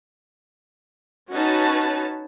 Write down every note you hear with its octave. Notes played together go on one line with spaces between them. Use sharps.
C#4 D#4 F#4 B4 C#5 A5